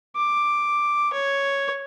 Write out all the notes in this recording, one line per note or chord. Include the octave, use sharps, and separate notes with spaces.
D6
C#5